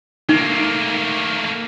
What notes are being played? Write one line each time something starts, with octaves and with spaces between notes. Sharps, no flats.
A3 A#3 D#4